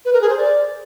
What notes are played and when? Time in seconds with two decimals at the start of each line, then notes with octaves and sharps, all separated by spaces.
0.05 B4
0.13 A#4
0.21 G#4
0.29 C5
0.37 D5